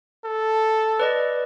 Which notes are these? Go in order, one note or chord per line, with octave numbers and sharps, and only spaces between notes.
A4
B4 D5 D#5